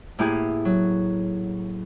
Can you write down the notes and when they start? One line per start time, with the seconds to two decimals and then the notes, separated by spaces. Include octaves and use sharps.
0.19 A2 A#3 B3 E4 G4 G#4
0.65 F#3